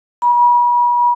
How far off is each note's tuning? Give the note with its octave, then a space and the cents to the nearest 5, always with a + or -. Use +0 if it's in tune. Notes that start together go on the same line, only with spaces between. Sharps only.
B5 -40